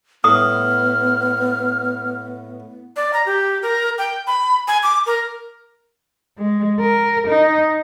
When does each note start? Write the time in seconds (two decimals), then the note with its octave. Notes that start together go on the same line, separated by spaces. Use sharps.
0.24 A2 B3 D#6 F6
2.96 D5
3.13 A#5
3.26 G4
3.63 A#4
3.98 G5
4.27 B5
4.68 G#5
4.83 D6
5.06 A#4
6.37 G#3
6.81 A#4
7.28 D#4